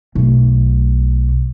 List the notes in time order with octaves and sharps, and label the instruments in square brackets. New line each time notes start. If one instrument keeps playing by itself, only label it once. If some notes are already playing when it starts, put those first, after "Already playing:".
[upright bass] B1 A3